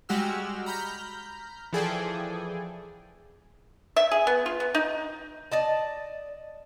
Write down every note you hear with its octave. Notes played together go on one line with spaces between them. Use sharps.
G3 G#3 F#4 G4 E6 F6
A#5 B5 F6 G6
E3 F3 G#4 A4 D5 G5
E5
G#4
B3
F4
B3
D#4
D5 D#5 A5